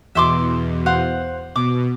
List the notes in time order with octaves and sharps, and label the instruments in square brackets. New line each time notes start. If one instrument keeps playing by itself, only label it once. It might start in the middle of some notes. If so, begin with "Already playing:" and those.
[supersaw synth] E2 B2 [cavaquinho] E5 C6 D6
[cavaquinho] C5 F5 F#5
[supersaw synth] B2 [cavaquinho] D6